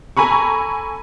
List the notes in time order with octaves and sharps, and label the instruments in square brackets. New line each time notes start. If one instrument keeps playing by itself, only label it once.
[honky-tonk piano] A4 G#5 A#5 B5 C#6